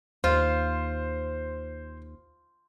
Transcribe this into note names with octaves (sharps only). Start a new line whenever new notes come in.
D#2 F4 C5